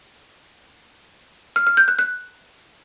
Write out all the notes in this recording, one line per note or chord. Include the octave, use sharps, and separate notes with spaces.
F6
F6
G6
F#6
F#6